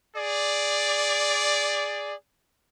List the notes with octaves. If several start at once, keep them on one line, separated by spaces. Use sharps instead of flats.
G#4 D5